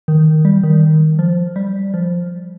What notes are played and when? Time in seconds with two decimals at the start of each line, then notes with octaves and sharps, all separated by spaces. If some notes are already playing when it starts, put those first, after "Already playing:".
0.08 D#3
0.45 G3
0.63 D#3
1.19 F3
1.56 G3
1.94 F3